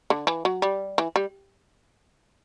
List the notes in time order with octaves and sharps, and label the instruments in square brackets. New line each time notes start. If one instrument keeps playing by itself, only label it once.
[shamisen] D3
E3
F#3
G3
E3
G3